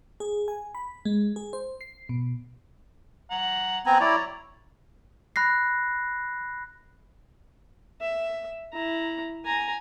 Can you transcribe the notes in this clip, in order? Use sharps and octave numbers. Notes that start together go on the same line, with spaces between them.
G#4
G#5
B5
G#3
G#4
C5
C7
B2
F#5 A#5
B3 C4 G#5 A#5
E4 C#5 D5 A#5
B5 F#6 A#6 C7
E5
E4 A#5
G#5 A#5